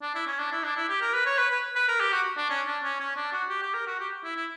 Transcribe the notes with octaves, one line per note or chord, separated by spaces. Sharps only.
D4
E4
C#4
D4
E4
D4
E4
G4
A#4
B4
C#5
B4
B4
B4
A#4
G4
F#4
D4
C#4
D4
C#4
C#4
D4
F#4
G4
G4
A#4
F#4
G4
E4
E4